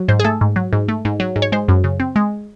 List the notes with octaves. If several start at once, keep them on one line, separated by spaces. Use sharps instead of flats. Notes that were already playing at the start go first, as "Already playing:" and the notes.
Already playing: F#3
G#2 C5
G#4
A3 A4
G#2
F#3
G#2
A3
G#2
F#3
G#2
C#5
G#3 C5
F#2
C#3
C4
G#3